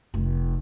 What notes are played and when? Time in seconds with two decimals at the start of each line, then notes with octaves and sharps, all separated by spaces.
0.14 F1